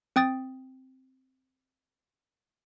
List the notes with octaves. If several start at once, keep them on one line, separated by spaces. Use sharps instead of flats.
C4 G5 D#6 A6